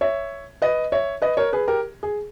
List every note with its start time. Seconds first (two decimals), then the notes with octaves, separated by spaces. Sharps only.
0.01 C#5 E5
0.62 B4 D#5
0.92 C#5 E5
1.22 B4 D#5
1.37 A#4 C#5
1.53 G#4 B4
1.68 G4 A#4
2.03 G#4